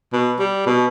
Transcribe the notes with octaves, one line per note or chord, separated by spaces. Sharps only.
B2
G3
B2